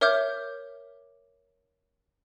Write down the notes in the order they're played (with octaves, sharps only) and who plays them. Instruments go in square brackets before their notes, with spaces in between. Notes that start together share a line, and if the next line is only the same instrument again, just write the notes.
[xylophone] A#4 C#5 E5 D6 F6 G6